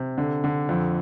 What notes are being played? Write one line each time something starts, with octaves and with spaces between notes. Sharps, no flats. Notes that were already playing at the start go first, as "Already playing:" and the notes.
Already playing: C3
D3
D3
F2